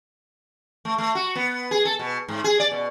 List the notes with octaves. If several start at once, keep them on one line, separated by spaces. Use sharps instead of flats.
A3
A3
F#4
B3
G#4
A4
B2
G#2
G#4
D5
B2